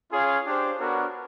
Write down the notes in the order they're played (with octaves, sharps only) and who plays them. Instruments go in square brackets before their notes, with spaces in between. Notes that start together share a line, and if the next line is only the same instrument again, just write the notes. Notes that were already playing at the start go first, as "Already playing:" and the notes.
[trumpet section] C#4 F4 G#4 C#5 F5
D4 G4 C5
B3 D4 F#4 A#4 C#5